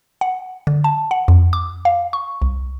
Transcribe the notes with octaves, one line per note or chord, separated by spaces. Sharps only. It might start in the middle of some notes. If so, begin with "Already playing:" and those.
F#5
D3
A5
F#5
F2
D6
F5
C#6
C2